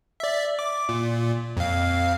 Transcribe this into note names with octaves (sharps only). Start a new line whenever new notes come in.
D5 E5
D6
A#2
F2 F5